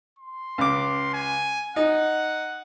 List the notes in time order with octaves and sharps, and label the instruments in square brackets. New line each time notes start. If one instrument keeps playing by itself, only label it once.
[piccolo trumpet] C6
[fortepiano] C#2 D6
[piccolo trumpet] G#5
[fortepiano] D#4 [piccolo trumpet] F#5